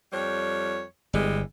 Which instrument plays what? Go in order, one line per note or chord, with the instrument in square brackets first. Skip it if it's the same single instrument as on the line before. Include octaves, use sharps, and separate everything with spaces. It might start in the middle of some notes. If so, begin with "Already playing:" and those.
[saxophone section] F2 G3 C#5
[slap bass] G1 [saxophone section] E3 G3 G#3